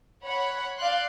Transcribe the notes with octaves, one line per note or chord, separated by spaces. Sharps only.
C#5 F#5 B5
D5 F5 C6 F#6